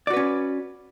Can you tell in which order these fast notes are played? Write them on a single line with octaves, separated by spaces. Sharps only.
D5 F#4 B4 C#4